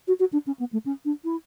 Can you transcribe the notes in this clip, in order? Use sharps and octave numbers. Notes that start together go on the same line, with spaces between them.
F#4
F#4
D4
C#4
B3
A3
C#4
D4
E4